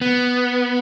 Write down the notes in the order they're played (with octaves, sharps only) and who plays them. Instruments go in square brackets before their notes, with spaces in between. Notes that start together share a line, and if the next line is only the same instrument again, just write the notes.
[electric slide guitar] B3